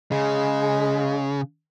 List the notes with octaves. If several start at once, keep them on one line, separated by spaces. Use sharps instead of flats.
C#3 G#3